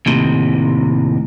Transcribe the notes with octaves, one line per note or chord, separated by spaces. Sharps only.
D#2 A2 C3